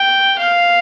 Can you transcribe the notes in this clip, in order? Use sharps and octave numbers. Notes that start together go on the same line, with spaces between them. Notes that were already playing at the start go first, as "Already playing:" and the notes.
Already playing: G5
F5